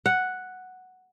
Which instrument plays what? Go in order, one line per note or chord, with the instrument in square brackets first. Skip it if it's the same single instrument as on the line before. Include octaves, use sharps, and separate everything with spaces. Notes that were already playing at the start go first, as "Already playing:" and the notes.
[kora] F#5